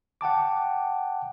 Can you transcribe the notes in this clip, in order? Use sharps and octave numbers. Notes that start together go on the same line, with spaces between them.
F#5 G5 A5 D6